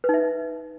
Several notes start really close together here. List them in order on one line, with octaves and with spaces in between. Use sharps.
B4 D#4 E5